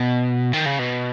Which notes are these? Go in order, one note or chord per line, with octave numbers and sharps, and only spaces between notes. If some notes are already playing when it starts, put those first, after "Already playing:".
Already playing: B2
D#3
C#3
B2